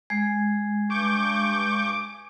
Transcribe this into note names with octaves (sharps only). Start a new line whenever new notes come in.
G#3 G#5 G#6 C7
G2 C#6 D6 G6